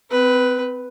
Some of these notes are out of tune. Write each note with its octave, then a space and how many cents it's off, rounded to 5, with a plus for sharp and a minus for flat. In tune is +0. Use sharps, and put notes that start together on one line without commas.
C4 -35 B4 +0